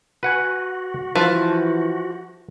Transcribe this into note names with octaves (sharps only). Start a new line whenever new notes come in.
F#4 B4 F#5 G#5
E3 F3 B4 E5 A5